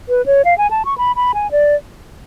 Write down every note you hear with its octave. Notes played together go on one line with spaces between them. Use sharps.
B4
C#5
F5
G#5
A5
C#6
B5
B5
G#5
D5